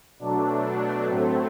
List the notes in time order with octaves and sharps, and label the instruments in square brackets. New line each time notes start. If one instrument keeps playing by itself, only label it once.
[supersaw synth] B2 F#3 A3 D4
A2 F#3 A3 C4